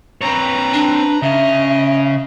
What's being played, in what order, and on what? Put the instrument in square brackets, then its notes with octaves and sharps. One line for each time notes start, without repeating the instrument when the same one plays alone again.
[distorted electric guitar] C4 C#5 [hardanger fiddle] B4 A#5
[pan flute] D4
[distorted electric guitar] C#3 [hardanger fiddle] D#5 [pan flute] E5